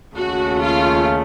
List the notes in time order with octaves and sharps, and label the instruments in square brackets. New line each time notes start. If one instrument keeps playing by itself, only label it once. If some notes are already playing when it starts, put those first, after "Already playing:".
[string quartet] D#2 C#3 A3 C#4 [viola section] F#4
[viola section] F4